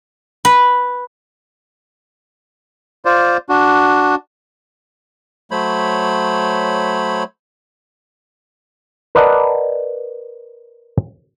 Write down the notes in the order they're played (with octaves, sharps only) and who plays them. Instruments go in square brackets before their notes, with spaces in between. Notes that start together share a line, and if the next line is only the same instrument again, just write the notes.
[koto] B4
[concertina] F4 C5 D5
D4 F#4
[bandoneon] F#3 A3 C5 C#5 B5
[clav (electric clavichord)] A#4 B4 D5 D#5 F#5 A5